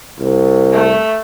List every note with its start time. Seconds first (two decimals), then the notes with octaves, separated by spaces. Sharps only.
0.20 C2
0.72 A3